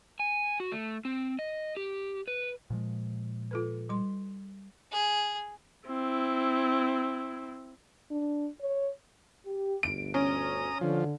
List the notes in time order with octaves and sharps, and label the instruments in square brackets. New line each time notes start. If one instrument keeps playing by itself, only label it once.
[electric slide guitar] G#5
F#4
A3
C4
D#5
G4
B4
[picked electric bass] A#2 F3 G#3
[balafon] F4 A4 B4
G3 C6
[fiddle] G#4
[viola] C4 E4
[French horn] D4
C#5
[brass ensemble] G4
[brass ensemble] G1 D2 [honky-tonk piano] D7
[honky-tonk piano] C#4 [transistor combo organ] A#5 D#6
[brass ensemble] D3 [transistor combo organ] F3